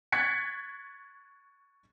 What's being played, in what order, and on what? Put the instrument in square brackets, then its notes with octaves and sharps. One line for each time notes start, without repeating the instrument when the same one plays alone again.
[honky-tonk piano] C#6 F#6 G#6 A6 B6 C#7